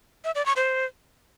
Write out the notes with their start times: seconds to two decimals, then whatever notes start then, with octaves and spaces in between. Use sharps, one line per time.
0.24 E5
0.35 D5
0.46 C#6
0.56 C5